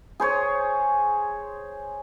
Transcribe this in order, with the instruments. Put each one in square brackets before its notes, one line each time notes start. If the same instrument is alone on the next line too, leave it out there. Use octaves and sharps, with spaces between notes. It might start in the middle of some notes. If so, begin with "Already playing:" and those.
[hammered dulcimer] G#4 C5 C#5